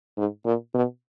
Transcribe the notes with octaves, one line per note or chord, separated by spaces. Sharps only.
G#2
A#2
B2